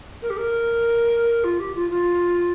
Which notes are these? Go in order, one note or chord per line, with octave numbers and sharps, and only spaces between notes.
A#4
G4
A#4
F4
G4
F4
F4